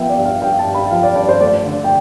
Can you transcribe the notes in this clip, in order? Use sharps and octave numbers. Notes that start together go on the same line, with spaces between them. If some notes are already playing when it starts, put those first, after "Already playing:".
Already playing: F3 B3 E5 G5
D5
G2
F5
G2 G5
A5
G2
B5
F3 F5
D5
G2 D5
C5
A3 D5
D3
G5